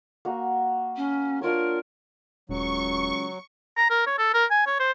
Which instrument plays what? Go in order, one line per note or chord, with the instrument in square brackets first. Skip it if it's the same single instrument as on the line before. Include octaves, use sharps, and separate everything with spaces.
[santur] A#3 F#4
[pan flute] C#4
[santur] D4 F4 C#5 [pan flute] A#4
[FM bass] D#1 [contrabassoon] C#2 [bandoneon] F#3 [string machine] C#6
[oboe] A#5
A#4
C#5
A4
A#4
G#5
C#5
C5